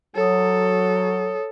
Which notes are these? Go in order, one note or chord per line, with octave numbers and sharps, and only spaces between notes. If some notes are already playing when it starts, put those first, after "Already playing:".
F#3 A4 C#5 D#6